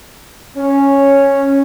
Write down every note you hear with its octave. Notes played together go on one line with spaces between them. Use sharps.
C#4